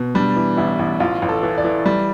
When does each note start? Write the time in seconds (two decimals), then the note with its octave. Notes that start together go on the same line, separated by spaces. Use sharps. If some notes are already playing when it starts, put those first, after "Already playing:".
Already playing: B2
0.15 G3 D4
0.36 E3
0.57 A1 E4
0.79 A1
1.00 A1 F4
1.22 A1
1.29 A4
1.43 E3
1.58 D5
1.65 E3
1.86 G3